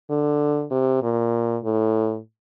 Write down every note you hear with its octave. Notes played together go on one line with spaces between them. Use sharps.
D3
C3
A#2
A2